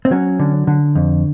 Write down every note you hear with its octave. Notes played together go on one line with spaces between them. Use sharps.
C4
F#3 C#4
D3
D3
F2